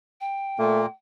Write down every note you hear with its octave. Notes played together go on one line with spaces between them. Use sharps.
G5
A#2 A3 A#3